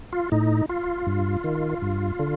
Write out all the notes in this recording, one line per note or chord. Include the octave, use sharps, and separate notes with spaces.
F4
A2 D#4
F4
G2
D#3
G2
D3